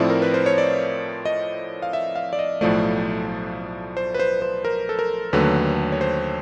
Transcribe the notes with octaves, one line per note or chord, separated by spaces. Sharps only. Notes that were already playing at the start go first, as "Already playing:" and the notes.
Already playing: A2 F3 A3 C4 E4 D5
A#4
B4
C5
C#5
D5
D#5
F5
E5
F5
D5
D#5
B1 A2 F3 A3 D5
C5
B4
C5
C5
A#4
A4
A#4
D#2 D3 F#3 A3 B4
C#5
C5